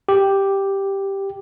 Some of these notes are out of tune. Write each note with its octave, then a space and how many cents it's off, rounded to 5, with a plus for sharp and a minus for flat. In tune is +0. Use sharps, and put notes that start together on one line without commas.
G4 +0